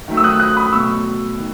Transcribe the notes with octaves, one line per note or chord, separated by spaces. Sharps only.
D#3 F#3 A3
E6
D#6 F#6
D#6 F#6
B5 D#6
B2 F#3 A3 C#6 E6
D#3